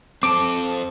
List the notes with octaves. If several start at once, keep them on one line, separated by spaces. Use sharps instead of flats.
C4 A4 D6